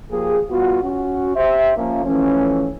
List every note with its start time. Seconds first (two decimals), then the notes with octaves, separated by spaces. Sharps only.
0.12 F3 A#3 G4 G#4
0.51 G3 B3 F4 F#4
0.83 C#4 F#4
1.36 G4 C5 E5
1.76 F3 A#3 C#4
2.05 E3 F3 A3 C#4